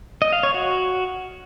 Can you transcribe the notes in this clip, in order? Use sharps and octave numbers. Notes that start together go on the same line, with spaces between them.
D#5
F5
C#5
F#4